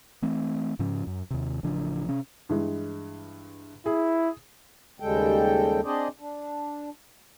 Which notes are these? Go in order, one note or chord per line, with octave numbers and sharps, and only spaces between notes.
E3 A3 C4
G#2 C#3 F3 C#4
F#2
D#2 C3
A1 C#3 F3 D4
C3 C#4
G2 E3 G#3
E4 G#4
D#2 C#3 G3 G#3 A4 G5
C4 D4 G#4 C5 D5 D#5
D4